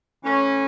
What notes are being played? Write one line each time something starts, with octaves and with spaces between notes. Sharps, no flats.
E3 A3 C#4